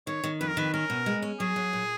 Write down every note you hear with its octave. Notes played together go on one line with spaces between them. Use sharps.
D#3 C#5
D#3
F2 B4
A#4
D#3 B4
C#4 A#4
B2
G#3
C#4
F#3 G#4
F#3
A#2